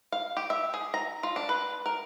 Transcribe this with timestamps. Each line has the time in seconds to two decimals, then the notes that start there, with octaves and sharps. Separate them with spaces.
0.12 F5
0.37 G4
0.50 E5
0.74 G#4
0.94 A#5
1.23 F4
1.36 D4
1.49 B4
1.86 A#4